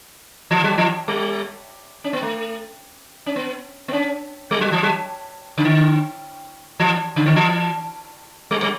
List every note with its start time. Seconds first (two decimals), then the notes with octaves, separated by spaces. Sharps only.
0.51 E3
0.64 F#3
0.78 E3
1.08 G3
2.04 C#4
2.13 B3
2.22 A3
3.26 C#4
3.36 B3
3.88 B3
3.93 C#4
4.51 G3
4.61 F#3
4.72 E3
4.83 F#3
5.58 C#3
5.64 D3
6.80 E3
7.16 C#3
7.26 D3
7.36 E3
8.51 G3
8.63 G3